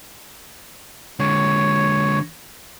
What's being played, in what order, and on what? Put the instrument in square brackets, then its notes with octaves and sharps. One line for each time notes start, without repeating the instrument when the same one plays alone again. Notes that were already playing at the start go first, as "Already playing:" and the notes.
[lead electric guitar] D3 G#3 [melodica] C#5